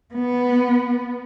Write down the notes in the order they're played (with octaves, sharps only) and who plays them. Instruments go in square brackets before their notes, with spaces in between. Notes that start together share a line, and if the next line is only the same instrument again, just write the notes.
[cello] B3